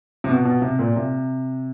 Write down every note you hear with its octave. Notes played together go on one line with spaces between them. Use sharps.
C3
B2
B2
C3
A#2
C3